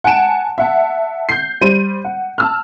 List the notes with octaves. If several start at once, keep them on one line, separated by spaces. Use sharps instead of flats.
F#5 G#5 A5 D7 E7
E5 F#5 A5
G6 C7
G3 C5 D#7
F#5
A5 E6 F6